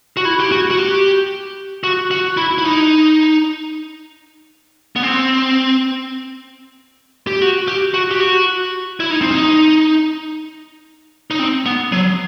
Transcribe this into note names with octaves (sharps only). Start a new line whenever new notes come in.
F#4
E4
G4
F#4
F#4
G4
F#4
F#4
E4
E4
D#4
B3
C4
G4
F#4
G4
F#4
G4
F#4
E4
D#4
C4
D#4
D#4
C4
B3
F#3